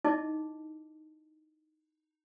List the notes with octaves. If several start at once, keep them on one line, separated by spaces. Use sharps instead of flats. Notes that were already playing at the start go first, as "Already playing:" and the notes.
D#4 E4 D#5 A5 D6